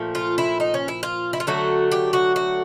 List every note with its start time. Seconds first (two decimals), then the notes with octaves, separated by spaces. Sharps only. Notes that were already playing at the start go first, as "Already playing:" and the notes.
Already playing: A#2 F3 A3
0.15 F4
0.38 E4
0.60 D#4
0.74 C#4
0.88 E4
1.03 F4
1.33 E4
1.40 F4
1.47 D3 F#3 A3 F#4
1.92 G4
2.13 F#4
2.36 F#4